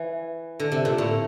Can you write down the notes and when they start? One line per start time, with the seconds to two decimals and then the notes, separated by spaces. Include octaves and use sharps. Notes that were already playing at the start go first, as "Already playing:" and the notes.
Already playing: E3
0.60 D3
0.72 C3
0.85 A#2
0.98 A2